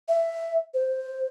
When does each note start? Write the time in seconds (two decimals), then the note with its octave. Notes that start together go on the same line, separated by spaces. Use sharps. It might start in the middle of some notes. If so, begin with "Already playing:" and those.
0.08 E5
0.74 C5